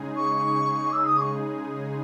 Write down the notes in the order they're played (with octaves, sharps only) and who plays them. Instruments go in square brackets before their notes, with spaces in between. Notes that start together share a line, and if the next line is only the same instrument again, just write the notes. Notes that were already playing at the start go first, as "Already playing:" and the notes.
Already playing: [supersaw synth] C#3 G#3 D#4 G#4
[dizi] C#6
E6
D#6
C#6